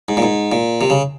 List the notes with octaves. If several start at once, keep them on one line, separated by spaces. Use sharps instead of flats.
G#2
A#2
G#2
A#2
C3
C#3